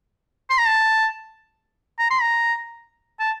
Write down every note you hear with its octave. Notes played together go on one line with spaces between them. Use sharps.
C6
A#5
A5
A#5
C6
A#5
A5